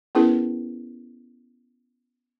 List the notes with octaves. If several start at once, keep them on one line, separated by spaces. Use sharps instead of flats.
B3 C#4 E4 G#4 A#4 B4